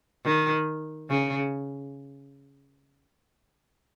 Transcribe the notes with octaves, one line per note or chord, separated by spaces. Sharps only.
D#3
C#3